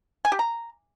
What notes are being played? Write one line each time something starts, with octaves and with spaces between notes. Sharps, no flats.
G#5
G4
A#5